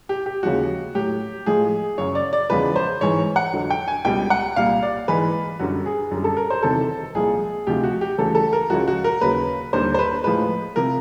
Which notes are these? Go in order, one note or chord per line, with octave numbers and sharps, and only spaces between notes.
G4
G4
D#2 C#3 F3 G#3 F#4
A2 F#3 G4
A2 F3 G#3 G#4
F#2 C#3 F#3 C#5
D5
D5
E2 C#3 F3 G#3 B4
C5
G#2 E3 G#3 C#5
F#5
F2 D3 F#3
G5
G#5
C#2 B2 G3 G5
F#5
C2 A#2 G3 F5
D5
G#2 E3 G#3 B4
F#2 D3 G3 F#4
G#4
F#2 D3 G3
A4
A#4
C5
E2 C3 D#3 F#3 A4
C2 A#2 F3 G#3 G#4
D2 C3 F3 G#3 G4
F#4
G4
D2 C#3 E3 G3 A4
A4
A#4
C#2 C#3 F3 G#3 F#4
F#4
A#4
D#2 C#3 F#3 B4
D#2 D3 G3 C5
C5
B4
A2 F3 G#3 B4
C3 F3 A#4